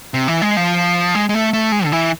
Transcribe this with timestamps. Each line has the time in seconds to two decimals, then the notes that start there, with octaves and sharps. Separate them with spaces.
0.14 C3
0.28 E3
0.42 G#3
0.57 F3
1.15 G#3
1.29 G#3
1.34 A3
1.53 A3
1.72 G#3
1.85 D3
1.92 E3